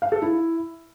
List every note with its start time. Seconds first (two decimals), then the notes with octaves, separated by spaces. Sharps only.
0.02 F5
0.12 A4
0.22 E4